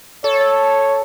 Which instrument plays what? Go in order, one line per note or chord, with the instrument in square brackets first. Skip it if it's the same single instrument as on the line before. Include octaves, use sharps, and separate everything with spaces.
[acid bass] A4 [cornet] C#5